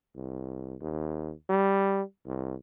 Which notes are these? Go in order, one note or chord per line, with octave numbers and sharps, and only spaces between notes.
C2
D#2
G3
C2